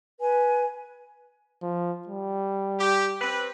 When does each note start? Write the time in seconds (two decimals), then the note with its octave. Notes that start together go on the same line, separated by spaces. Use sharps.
0.20 B4 G#5
1.62 F3
2.07 G3
2.79 G4
3.21 C4 B4